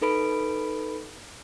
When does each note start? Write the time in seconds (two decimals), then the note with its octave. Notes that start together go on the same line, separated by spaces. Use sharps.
0.02 D#4 A4 B4 B5 D7